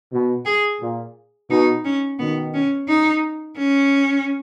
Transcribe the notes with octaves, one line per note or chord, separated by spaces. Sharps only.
B2
G#4
A#2
B2 D#4
C#4
B2 D#3 B3
C#4
D#4
C#4